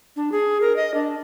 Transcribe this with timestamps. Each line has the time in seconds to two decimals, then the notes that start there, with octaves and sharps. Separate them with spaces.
0.16 D4
0.32 G#4
0.61 A#4
0.76 D#5
0.94 D4